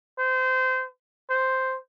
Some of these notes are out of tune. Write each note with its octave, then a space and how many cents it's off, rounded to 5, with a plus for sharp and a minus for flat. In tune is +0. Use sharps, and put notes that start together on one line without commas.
C5 -25
C5 +0